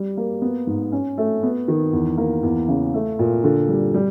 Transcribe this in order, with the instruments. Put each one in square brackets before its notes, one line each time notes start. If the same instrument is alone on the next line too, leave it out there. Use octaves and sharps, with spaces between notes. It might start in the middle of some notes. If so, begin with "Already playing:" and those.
Already playing: [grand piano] G3
A#3
B3
G#2
C#4
A3
B3
D#3
E2
A#3
E2
C#3
A3
A#2
D3
G3
G3